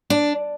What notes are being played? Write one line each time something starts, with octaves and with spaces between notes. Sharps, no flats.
D4